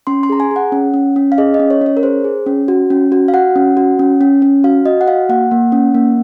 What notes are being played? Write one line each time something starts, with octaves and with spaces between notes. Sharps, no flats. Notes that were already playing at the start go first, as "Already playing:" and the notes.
C#4 C6
C6
G#4 A#5
G#5
G#4 F#5
C#4
C#4
C#4
F5
G#4 D#5
D#5
C#4
C#5
C#4 C#5
A#4
G#4 C5
G#4
C#4
F#4
C#4
F#4
F5
F#4 F#5
C#4
F#4
C#4
C#4
C#4
F#4 F5
F#4 D#5
F#5
F#4 F5
A#3 F#5
A#3
C#4
A#3